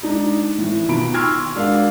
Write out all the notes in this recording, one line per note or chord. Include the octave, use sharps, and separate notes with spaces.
G#3 D4 D#4
A2 E3
B2 D#3 F4 B5 D7
C6 C#6 E6 F6 G#6
G#3 D4 F#4 A#4 F5